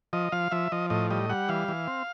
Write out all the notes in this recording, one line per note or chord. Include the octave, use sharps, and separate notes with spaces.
F3 D#5
F3 F5
F3 E5
F3 D#5
A2 D#5
G3 D#5
G3 F#5
E3 F5
E3
C4